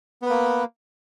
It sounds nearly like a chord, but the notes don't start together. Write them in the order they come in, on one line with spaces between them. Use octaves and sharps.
B3 B4 A#3